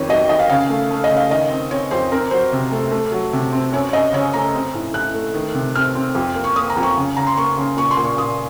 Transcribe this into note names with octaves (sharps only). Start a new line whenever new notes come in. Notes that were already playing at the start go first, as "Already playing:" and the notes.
Already playing: F2 D#3 C#5
F#3 D#5
D#3 D#5
F5
C#3 F5
A3
A3
D#5
C#3
F5
D#3 D#5
C4
C4 C#5
F2 C5
C4 A#4
F#3 C5
C3
A3
A3
F#3
C3
C4
F#2 C#5
C#5
F#2 D#5
C#3 C#5
A3 A#5
C4
A2
A2 F#6
A3
D#3
C3
C4 F6
C4
F2
A#3
C#6
A#3 D#6
A#5
F2
C#6
C#3
C#3 A#5
C6
A#3 C#6
C#3
A#2 C#6
C6
A#2
C#6
A#2 D#6